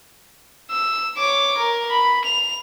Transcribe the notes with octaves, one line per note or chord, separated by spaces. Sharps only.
E6
C#5 D6
A#4
B5
F7